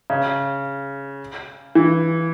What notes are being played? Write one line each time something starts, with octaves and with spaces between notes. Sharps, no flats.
C#3
E3